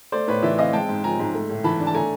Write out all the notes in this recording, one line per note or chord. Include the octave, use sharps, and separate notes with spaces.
A3 C5 D5
A2 B4 C#5
E3 D5 E5
C4 D#5 F5
G#3 G5 A5
G#2
F3 G#5 A#5
G#2
A3
A2
E3 A5 B5
D4
A5
A3 G#5 A#5